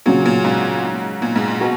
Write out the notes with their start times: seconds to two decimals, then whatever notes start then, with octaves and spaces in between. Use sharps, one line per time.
0.06 A#2 C#3 F#3 C#4 F#4
0.26 A#2
0.45 G#2
1.22 A#2
1.36 G#2
1.48 A#2
1.61 B2 F#4